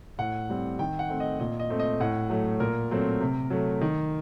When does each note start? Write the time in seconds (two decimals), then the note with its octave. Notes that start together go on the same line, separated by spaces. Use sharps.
0.19 A2 F#5
0.50 G3 C4
0.79 D#3 G5
0.99 F#5
1.09 A3 C4
1.20 D#5
1.40 A#2 D#5
1.60 D#5
1.70 A3 C4
1.79 D#5
2.00 A2 F#5
2.30 F#3 A3
2.60 A#2 A#4
2.91 F#3 A3 C4
3.21 C3
3.50 F#3 A3
3.81 D#3